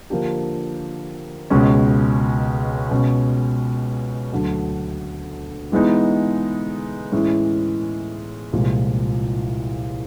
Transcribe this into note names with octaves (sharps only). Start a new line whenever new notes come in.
D3 F3 A#3 D4 G4
C#2 B2 G#3 C#4
B2 G#3 C#4
D2 D3 F#3 A3
E3 G#3 B3 D#4
A2 E3 G#3 C#4 E4
C2 A#2 F3 G#3